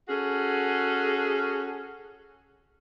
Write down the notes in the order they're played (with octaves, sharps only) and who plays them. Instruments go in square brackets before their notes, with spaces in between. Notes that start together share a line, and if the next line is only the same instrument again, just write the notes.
[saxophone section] C#4 F#4 G#4 A4